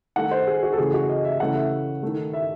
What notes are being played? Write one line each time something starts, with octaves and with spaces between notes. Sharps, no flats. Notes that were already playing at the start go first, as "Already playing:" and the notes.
D#3 A3 F#5
C5
G#4
F#4
A4
C#3 E3 A3 G#4
F#4
D#5
E5
C#3 E3 A3 F#5
E5
D#3 A3
E5